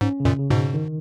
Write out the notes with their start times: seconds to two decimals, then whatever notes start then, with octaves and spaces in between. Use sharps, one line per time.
0.01 G#2 C#4
0.20 C#3
0.25 F#2 A#2
0.38 C#3
0.50 G#2 B2
0.56 C#3
0.74 D#3